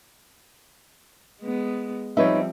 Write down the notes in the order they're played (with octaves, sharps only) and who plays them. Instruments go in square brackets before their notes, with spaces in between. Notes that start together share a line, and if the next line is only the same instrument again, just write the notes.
[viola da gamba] G#3 B3
[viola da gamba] F3 G3 C4 [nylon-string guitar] D#4 B4 C#5 [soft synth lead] E5